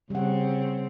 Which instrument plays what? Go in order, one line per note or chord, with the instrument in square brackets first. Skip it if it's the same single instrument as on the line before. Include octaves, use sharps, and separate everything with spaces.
[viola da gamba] C#3 C4 [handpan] G3 F#5